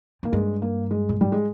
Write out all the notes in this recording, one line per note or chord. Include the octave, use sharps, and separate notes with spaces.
G#2 A#3
G2 G#3
A#3
G#3
A#2
G#2 G3
G#3